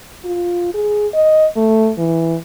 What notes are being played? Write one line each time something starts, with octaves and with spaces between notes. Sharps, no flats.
F4
G#4
D#5
A3
E3